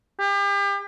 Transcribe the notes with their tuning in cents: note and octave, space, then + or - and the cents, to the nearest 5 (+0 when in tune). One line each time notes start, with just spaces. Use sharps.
G4 +35